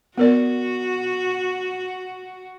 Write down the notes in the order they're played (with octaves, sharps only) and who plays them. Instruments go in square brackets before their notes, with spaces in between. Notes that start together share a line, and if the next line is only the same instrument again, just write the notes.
[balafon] B3 A#4 D5 [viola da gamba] F#4